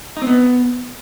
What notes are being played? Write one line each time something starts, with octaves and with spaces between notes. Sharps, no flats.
D#4
C4
B3